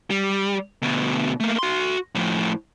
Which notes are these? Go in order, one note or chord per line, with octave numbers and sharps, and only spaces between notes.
G3
D2 B2
A3 A#3
F#4 C6
A2 F3